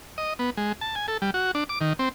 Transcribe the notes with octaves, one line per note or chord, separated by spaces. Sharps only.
D#5
B3
G#3
A5
G#5
A4
G3
F#4
D4
D6
D#3
C4